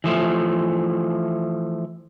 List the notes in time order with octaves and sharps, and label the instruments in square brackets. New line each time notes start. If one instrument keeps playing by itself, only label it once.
[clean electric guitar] E3 F3 A3